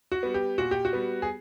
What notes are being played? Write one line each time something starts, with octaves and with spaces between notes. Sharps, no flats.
F#4
G3 B3
G4
A#2 F#4
G4
F#4
G3 B3
G#4